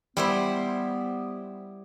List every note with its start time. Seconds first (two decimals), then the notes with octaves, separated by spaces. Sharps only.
0.17 G3 B3 E4 C5